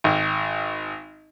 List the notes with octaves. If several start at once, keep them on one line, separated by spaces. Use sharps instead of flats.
G#1